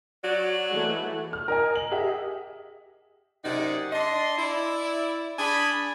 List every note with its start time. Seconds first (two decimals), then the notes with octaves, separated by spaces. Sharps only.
0.24 F#3 F#4 D5
0.71 E3 G#3 A3
1.33 F6
1.48 A#4 D#5 G#5
1.76 F#7
1.91 G4 G#4 D#5 E5 F#5
3.45 F#2 C3 D#4 G#4 D5 F#5
3.93 D4 D5 D#5 C6
4.38 E4 D5
5.39 D4 G#4 G#5 B5